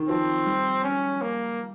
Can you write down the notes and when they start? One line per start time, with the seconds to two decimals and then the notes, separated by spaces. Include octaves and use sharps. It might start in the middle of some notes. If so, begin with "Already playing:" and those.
Already playing: D#3
0.08 F3 C4
0.46 G3
0.84 C#4
1.21 A#3